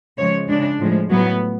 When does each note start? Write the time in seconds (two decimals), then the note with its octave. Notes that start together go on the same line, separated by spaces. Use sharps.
0.18 C#3 F3 G#3 C#5
0.49 C#3 G#3 D4
0.79 A2 F3 G#3
1.10 A2 F#3 A3 B3